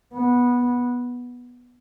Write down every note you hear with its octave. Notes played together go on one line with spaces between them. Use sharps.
B3